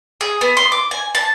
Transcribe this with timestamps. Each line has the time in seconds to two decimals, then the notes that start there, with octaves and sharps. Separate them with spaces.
0.21 G#4
0.41 B3
0.57 C6
0.72 D6
0.91 G#5
1.15 A5